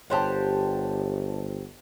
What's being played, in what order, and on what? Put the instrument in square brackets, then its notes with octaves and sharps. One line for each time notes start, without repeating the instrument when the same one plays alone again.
[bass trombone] G1 [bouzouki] G4 C5 F#5 [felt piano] C#5 A5